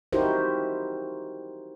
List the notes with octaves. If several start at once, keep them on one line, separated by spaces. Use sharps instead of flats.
D#4 E4 F#4 G4 A#4 C5